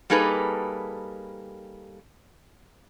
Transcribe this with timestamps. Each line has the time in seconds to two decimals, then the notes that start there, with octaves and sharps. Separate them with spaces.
0.10 G3 A#3 D#4 G#4 A4 B4